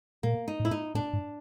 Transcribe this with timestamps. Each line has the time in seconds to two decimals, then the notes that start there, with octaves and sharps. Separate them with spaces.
0.23 A#2 A#3
0.48 D#4
0.60 A2
0.65 E4
0.71 D#4
0.95 A2 D4
1.13 G#2